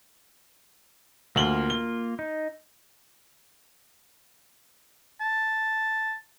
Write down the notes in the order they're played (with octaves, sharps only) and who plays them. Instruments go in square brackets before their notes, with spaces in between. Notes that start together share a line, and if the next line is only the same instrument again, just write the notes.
[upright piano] D2 F#7 G7 [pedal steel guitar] A#3 F4
[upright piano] G7
[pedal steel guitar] D#4
[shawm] A5